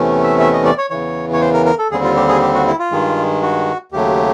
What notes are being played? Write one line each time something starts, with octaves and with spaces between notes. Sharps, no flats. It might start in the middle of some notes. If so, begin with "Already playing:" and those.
Already playing: E2 C3 E3 A3 C#4
E5
E5
D#5
D5
C#5
E2 C#3 E3 C#5
C#5
C5
A#4
A#4
A4
D#2 D3 G3 C4 G#4
F4
G4
G#4
G4
F#4
E4
F4
G2 D#3 G#3
F#4
D#2 C#3 F#3 A3 G4